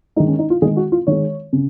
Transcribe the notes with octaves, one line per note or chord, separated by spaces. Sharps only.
D#3 G#3 D#4
C#4
D#4
F4
D#3 G#3 G#4
F#4
F4
D#3 G#3 C#5
C#3